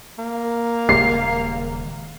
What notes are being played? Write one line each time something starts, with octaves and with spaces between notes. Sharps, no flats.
A#3
D#1 C#3 G#3 C7